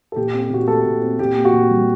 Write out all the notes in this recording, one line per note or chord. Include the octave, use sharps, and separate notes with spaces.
A4
A#2 G4
C4
G4
A#2 F#4
G4
A3 A4
A#2
C4
A#2 G4
A#3
F#4
A#2
G3